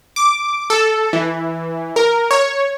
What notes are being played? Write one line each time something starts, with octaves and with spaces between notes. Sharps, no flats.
D6
A4
E3
A#4
C#5